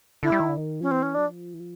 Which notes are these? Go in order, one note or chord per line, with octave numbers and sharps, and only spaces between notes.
D3 E4
G3
D#3
D3
D#3
F3 C#4
E3 C4
C#4
F#3 D4
F3
E3
F3